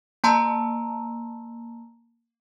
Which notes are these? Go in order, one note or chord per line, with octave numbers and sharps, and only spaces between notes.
A#3 A5 A#5 C6 E6